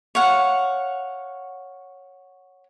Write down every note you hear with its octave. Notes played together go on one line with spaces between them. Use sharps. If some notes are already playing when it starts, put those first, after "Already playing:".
C#5 F5 F#5